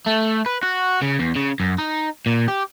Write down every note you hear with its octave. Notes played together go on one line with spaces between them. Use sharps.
A3
B4
F#4
C#3
E2
C#3
F#2
D#4
A#2
G4